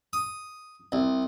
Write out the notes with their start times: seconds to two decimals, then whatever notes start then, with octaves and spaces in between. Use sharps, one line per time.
0.13 D#6
0.92 C2